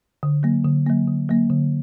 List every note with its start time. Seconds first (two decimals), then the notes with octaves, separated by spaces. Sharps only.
0.23 D3
0.43 F#3 A#3
0.65 D3
0.87 F#3 A#3
1.07 D3
1.29 F#3 A#3
1.50 D3